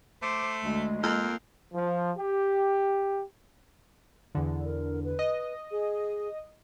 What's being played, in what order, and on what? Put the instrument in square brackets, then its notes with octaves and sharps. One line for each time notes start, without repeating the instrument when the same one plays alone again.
[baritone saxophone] A3 [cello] C5 [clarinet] D6
[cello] D2 [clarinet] G#3
[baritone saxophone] F2 [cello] A#3
[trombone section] F3
G4
[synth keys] E2 D3
[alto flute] A#4
B4
[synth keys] D#5
[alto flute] G#4